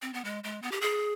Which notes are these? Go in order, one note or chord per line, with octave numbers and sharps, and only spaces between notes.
C4
B3
G#3
G#3
B3
G4
G#4